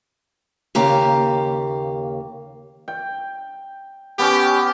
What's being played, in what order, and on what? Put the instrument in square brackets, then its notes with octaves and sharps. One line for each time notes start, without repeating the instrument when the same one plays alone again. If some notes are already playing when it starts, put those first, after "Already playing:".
[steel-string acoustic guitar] D#2 C#3 A#3 G4 A#5
[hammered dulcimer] G5
[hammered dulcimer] B3 C#4 [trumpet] G4